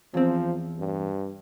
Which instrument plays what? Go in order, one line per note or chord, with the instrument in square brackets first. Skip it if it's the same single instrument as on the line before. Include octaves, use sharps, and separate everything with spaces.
[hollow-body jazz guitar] E2 C4 [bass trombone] F3
[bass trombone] G2